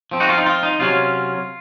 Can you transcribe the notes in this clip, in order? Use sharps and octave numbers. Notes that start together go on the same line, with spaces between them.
F3 C4
D#4 F#4
F4
D#4
F4
D#4
C3 F#3 C#4 F4